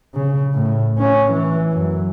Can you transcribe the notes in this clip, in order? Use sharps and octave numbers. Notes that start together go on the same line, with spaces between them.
C#3
A2
C#4
E3
F#2